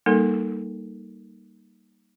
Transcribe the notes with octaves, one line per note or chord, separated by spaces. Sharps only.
G3 A#3 D#4 A4 A#4